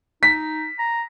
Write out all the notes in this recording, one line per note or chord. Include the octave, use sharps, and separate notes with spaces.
D#4 B6
A#5